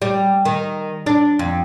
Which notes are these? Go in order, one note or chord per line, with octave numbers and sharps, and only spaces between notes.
G3
D#3
D4
F2